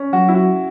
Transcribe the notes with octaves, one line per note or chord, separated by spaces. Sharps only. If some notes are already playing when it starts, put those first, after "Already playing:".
Already playing: C#4
F#3 F#4
E4
F#4